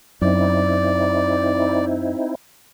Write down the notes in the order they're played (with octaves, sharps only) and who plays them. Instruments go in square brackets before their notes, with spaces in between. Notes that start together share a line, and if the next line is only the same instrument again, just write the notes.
[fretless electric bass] F#2 [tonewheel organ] C4 D#4 E4 [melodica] D5